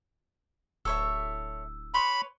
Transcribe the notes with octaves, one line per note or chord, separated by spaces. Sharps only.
D1 A4 C#5 E5 E6
B4 C#5 B5 C6